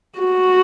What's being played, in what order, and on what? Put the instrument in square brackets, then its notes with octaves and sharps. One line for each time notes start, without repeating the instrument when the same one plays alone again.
[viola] F#4